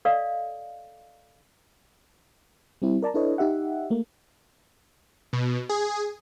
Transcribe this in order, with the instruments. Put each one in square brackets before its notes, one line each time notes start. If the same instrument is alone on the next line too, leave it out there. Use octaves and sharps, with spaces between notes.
[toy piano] A4 D5 D#5 F5
[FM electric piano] G3 C4 E4
A#4 D5 A5 A#5
D4 E4 A4 B4 C#5 D#5
D#4 G4 E5 F#5
A3 A#3
[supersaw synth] B2
G#4